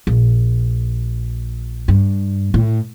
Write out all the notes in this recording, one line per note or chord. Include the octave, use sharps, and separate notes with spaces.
A#1
G2
A2